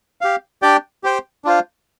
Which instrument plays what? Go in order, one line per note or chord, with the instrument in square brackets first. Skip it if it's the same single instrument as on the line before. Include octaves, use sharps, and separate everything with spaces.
[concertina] G4 F5
D4 G4 D5 G5
G4 C5 G5
D4 F4 C5 F5